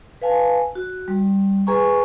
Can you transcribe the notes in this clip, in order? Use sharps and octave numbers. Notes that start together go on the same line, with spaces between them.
B4 F5 G#5 A5
F#4
G3
G#4 B4 G#5 A#5 C#6